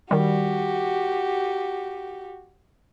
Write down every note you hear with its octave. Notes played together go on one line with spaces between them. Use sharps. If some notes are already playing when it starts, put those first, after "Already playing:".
D#3 G3 F#4 G4